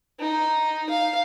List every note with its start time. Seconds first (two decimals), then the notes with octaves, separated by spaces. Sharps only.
0.20 D#4
0.89 F5